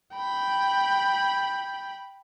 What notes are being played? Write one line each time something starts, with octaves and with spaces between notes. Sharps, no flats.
G5 B5